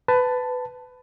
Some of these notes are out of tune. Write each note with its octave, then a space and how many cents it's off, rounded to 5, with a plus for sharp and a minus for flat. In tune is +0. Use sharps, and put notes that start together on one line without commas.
B4 +20 A5 +5